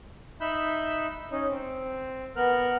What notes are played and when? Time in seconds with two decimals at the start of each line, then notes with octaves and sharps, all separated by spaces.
0.41 D#4 E5 B5 E6 F#6 G6
1.32 C#4 D#4
1.50 C4
2.36 B3 A#4 F6 F#6